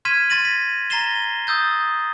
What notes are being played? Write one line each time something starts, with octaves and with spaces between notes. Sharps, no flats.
C6 F6 G#6 B6 D#7 E7
C6 A6 A#6 D#7 F#7
B6
A#5 A6 A#6 C7 E7 G7
D#6 E6 G6 A6